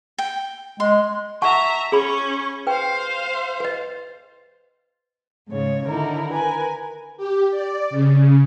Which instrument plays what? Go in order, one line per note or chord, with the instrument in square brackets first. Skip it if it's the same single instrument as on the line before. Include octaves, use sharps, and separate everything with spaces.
[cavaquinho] G5
[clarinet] G#3 [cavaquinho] C6
[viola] E5 A#5 [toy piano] F#5 A5 C#6
[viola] C#4 C#6 [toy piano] G#4 B5
[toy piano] B4 G5 [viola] C5 F5
[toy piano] B4 D#5
[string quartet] G#2 C#3 C#5
D3 D#3 D#4 E4 A#4
A#4 B4 G#5
[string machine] G4
D5
C#3